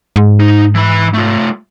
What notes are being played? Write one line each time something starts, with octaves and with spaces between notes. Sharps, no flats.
G#2
D#4
E3 B5
A3 F4